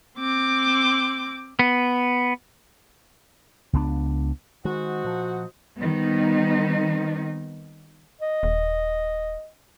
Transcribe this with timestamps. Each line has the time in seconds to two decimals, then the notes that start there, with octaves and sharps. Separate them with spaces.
0.18 C4 D6
1.59 B3
3.73 C#2 B3 D4
4.65 D#3 G#3 F#4 C5 D#5 F#5
5.05 A#2 F3
5.80 D#3 G3 B3 C4 D#4
8.21 D#5
8.43 D#1